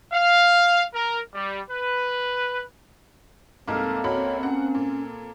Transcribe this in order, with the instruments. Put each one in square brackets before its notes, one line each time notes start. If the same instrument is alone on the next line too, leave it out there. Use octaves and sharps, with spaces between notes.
[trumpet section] F5
A#4
G3
B4
[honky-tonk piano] C2 G#2 [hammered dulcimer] A#3 A4 F5 [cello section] C4
[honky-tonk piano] C#2 F#4 B5 [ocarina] C#5
[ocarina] C#4 [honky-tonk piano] F#5
[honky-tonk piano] A#2